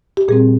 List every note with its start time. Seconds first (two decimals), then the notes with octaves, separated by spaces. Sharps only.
0.17 G4
0.28 A#2 G3 C4 G#4